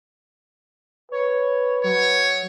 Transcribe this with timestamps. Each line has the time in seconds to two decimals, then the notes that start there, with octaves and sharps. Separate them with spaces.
1.12 B4 C#5
1.84 F#3 C#5